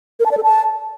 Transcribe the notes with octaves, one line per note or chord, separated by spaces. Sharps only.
A#4
A5
D5
A4
A5